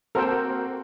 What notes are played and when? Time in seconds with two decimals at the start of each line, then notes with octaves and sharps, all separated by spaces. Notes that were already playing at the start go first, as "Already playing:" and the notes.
0.15 A#3 C4 F#4 A4 A#4 C5 G5